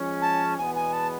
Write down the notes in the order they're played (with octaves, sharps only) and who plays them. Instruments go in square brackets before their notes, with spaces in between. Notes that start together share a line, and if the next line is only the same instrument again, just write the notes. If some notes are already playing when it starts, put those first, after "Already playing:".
Already playing: [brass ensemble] F3 G#3 C#4
[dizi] A5
[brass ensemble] E2 B2 G#3 B3 [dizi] G#5
[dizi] G#5
A5